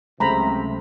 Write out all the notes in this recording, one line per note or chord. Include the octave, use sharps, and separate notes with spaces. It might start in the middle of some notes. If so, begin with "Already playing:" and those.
C#2 C3 F#3 A3 C5 A#5 B5